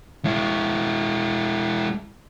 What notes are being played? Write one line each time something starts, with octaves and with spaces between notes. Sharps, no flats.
G#3 E4